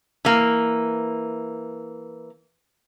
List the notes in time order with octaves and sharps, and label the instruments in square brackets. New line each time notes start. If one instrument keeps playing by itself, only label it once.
[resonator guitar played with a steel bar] E3 A#3